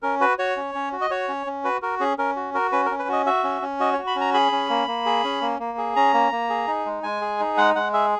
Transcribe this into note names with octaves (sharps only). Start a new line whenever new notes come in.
C#4 A#4
F#4 B4
F#4 C#5
C#4
C#4
F#4
D#5
F#4 C#5
C#4
C#4
F#4 B4
F#4 A#4
C#4 G#4
C#4 A#4
F#4
F#4 A#4
C#4 B4
A#4
C#4
B4
F#4 D#5
F#4 E5
C#4
C#4
F#4 D#5
C#5
F#4
B5
C#4 A#5
G#4 B5
C#4
A#3
A#3
G#4
C#4
A#3
A#3
G#4
C#4 A#5
A#3
A#3
G#4
D#4
G#3
G#3 G#5
G#4
D#4
G#3 F#5
G#3 F#5
G#4 E5